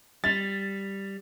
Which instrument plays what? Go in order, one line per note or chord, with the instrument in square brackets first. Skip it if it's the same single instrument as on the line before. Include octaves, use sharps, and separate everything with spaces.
[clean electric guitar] G3 [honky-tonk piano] A6